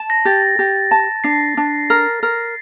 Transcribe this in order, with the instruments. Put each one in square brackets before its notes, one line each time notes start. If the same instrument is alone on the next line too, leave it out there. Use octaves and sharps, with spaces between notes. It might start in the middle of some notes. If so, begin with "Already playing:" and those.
Already playing: [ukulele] A5
[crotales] A#6
[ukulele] G4 [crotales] A6
[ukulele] G4
A5
[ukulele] D4 [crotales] C7
[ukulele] D4
A#4
A#4